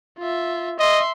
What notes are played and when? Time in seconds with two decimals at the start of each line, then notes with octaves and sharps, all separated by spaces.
0.19 F4 E5
0.79 D#5 E5 C6